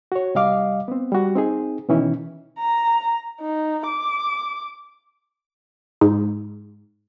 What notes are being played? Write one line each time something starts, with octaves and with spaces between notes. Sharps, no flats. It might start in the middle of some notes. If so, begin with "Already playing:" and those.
F#4 C#5
C2 G3 D#5 F5 D6
B3 C4
G3 F#4
C4 D#4 G#4
B2 D#3 E3 C#4 D#4 E4
A#5
D#4
D6
G#2